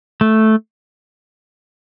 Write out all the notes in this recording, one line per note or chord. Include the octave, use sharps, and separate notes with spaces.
A3